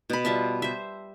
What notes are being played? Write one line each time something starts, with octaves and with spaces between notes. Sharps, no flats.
B2 B5
G3 F4 E5 A5
C5 E5